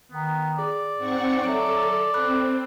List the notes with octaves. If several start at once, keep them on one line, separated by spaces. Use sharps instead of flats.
D#3 B3
G#4 D5
G#2 C4 F#5 C#6
F#3 A4 E5 D7
C4 A4 B5 F#6